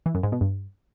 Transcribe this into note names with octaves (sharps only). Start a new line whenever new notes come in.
E3
F#2
G#2
B2
G2